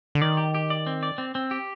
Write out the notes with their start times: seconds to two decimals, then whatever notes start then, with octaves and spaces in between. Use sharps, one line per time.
0.15 D3
0.21 D#3 D5
0.37 G4
0.55 G4
0.70 D5
0.87 C4
1.03 D5
1.18 C4
1.35 C4
1.51 G4